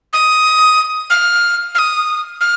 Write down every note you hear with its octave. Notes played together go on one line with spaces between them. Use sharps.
D#6
F6
F6
D#6
F6